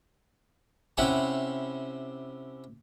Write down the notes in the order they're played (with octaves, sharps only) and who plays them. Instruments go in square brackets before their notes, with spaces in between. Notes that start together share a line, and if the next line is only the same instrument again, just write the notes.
[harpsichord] C3 C#4 E4 G4 F#5 B5